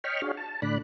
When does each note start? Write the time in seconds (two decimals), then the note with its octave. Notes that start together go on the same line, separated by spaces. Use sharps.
0.04 C#5 D#5 G5 B5 C#6 F6
0.22 D4 F#4 G#4 C#5 F5
0.38 A5
0.62 A2 D3 D5 B5 F#6